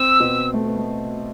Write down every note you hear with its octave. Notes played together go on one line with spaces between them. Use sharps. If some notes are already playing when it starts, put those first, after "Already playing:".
Already playing: C4 E6
B2 B3
A3
B3
A3